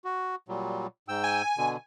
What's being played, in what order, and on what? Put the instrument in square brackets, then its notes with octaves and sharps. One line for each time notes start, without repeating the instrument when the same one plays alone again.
[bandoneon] F#4
A#2 F#3 G3
G#2 G5 E6
[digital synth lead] G#5
[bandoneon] B2 D3